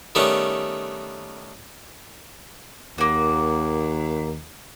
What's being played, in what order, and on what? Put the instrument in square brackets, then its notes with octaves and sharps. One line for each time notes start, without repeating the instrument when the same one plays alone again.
[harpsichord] D#3 G3 A3 B3 C#4
[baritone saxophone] D#2 [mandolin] A#3 F#4